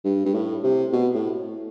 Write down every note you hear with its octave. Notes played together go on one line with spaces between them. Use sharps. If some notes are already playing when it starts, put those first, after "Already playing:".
G2
G2
A2
C3
B2
A2